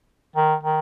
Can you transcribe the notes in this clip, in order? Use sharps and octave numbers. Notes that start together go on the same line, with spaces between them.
D#3
D#3